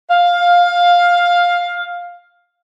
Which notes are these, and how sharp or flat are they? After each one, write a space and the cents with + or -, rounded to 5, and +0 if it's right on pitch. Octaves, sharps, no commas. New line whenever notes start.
F5 +10